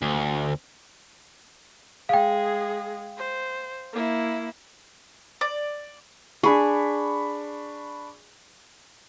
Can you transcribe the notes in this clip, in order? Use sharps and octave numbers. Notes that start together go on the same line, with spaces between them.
D2
G#3 G#4 F5 G5
C5
A#3 E4
D5
D4 G#4 B5 C#6